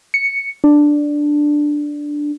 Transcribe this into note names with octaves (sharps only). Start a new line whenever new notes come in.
C#7
D4